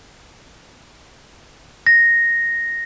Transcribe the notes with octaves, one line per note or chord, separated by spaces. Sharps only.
A#6